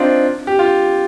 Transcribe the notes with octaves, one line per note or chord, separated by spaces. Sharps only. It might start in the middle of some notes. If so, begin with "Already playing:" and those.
Already playing: C4 D4 D#4 F4
G4
F4